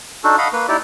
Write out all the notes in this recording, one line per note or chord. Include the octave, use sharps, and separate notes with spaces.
D4 D#4 F#4 A4
D#5 F5 F#5 B5
A#3 B4
D#4 E4 G4 D5